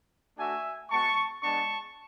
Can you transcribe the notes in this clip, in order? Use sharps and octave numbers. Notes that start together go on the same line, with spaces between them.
A3 D4 F#4 E5 G#5
G#3 B3 F#4 A5 C#6
G#3 B3 D4 A5 C#6